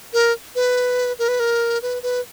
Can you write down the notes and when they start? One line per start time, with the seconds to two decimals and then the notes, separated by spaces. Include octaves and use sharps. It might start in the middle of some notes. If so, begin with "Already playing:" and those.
0.13 A#4
0.55 B4
1.19 A#4
1.28 B4
1.40 A#4
1.82 B4
2.03 B4